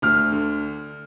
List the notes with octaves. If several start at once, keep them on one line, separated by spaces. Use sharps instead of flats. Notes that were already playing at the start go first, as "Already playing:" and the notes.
D2 F6
D3